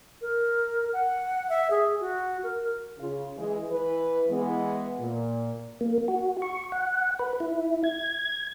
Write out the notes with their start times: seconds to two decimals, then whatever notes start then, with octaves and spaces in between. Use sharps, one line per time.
0.21 A#4
0.93 F#5
1.49 E5
1.70 G#4
2.00 F#4
2.43 A#4
2.99 C#3 F4
3.37 E3 G#3
3.69 E3 B4
4.28 E3 G#3 B3
4.99 A#2
5.81 A#3
6.08 F#4
6.42 C#6
6.72 F#5
7.19 B4
7.40 E4
7.84 G#6